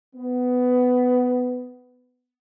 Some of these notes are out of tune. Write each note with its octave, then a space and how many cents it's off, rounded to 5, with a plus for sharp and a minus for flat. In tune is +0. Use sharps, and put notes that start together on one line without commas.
B3 +15